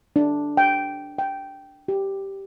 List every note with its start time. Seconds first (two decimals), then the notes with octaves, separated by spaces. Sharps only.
0.16 D4
0.57 G5
1.18 G5
1.88 G4